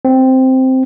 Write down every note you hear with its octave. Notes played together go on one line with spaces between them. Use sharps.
C4